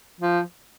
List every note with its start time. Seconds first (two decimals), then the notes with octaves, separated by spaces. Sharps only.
0.21 F3